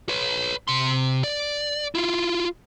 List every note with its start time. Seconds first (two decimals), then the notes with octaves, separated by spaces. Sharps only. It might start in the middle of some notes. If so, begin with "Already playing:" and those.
0.09 B4 C#5
0.68 C3 C6
1.24 D5
1.95 E4 F4